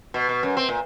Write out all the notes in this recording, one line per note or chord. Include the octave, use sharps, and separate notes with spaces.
B2
B2
F#2
C4
A#2